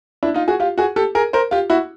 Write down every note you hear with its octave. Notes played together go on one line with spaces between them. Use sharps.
D4 E4
D#4 F4
F#4 G#4
F4 G4
F#4 G#4
G4 A4
G#4 A#4
A#4 C5
F4 G4
E4 F#4